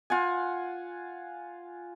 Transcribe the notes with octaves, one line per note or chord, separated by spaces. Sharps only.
F4 F#5 G#5